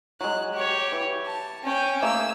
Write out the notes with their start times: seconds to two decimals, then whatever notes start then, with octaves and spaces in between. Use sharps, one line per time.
0.21 F#3 G#3 F#6
0.53 G4 C#5
0.92 E3
1.26 A5
1.63 C#4 G5
2.02 A3 A#3 G#4 E6